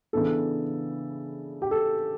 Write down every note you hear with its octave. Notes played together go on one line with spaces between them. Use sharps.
C#3 E3 B3 D4 A4
G4
A4